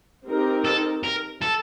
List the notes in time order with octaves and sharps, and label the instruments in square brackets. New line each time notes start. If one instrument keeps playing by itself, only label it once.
[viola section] C4 D#4 G4 A#4
[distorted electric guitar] A4
A#4
A4